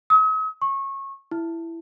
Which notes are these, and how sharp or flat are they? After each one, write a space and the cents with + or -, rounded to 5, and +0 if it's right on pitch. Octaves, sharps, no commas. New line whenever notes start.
D#6 +45
C#6 -25
E4 +10